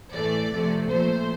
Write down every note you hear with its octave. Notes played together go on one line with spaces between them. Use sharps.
A2 E3 A3 D5
C3 F3 A3
A#2 F3 A3 C5